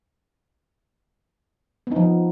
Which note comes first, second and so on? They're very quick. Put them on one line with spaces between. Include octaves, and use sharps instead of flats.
B3 D#4 F3